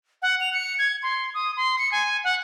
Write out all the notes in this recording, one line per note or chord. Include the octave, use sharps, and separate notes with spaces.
F#5
F7
C#7
G#6
C6
D#6
C6
C#7
G#5
F#5